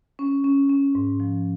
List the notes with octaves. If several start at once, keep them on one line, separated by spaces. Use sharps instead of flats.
C#4
C#4
C#4
G#2
F3